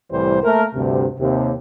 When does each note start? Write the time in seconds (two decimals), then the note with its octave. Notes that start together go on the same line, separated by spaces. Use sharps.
0.11 C2 A2 E3 G3 C5
0.43 A3 A#3 A#4
0.75 D2 G2 C3
1.19 D#2 C3